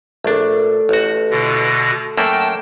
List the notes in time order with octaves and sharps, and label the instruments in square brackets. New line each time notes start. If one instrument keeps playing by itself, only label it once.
[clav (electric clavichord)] A#1 D4 [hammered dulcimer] A3
[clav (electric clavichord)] A1 F#4
[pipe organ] B2 D3 A#6
[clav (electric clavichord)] F#2 A3 A#3 [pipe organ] G5 A5